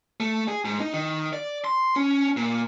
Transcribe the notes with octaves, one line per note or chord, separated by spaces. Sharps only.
A3
G#4
G#2
D#4
D#3
D5
C6
C#4
A#2